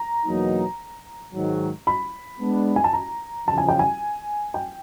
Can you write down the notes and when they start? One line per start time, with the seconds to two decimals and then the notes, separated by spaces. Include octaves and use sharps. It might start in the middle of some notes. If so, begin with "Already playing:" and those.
Already playing: A#5
0.26 E2 B2 F#3 A#3 D#4
1.34 G#2 D#3 F#3
1.87 B5
2.40 G#3 B3 D4
2.76 G#5
2.84 A5
2.93 A#5
3.48 E2 C#3 F3 A5
3.58 G#5
3.69 G5
3.79 G#5
4.54 G5